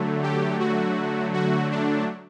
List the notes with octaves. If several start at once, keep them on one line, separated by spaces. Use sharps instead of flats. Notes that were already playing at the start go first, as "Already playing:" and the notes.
Already playing: D3 F#3 A3
G4
F#4
F#4
D4